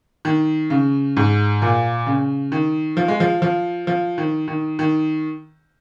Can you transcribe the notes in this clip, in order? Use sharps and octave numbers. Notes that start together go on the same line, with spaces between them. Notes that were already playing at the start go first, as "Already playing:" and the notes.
D#3
C#3
G#2
A#2
C#3
D#3
F3
G#3
F3
F3
F3
D#3
D#3
D#3